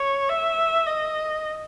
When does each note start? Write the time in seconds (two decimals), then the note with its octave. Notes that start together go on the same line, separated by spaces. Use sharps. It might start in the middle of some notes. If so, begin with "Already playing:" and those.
Already playing: C#5
0.30 E5
0.86 D#5